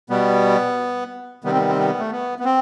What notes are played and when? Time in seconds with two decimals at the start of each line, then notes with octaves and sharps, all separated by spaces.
0.10 B2 G3 B3
1.44 C3 D#3 G3 B3
1.51 C4
1.58 B3
1.69 C4
1.78 B3
1.99 A3
2.11 B3
2.39 B3
2.45 C4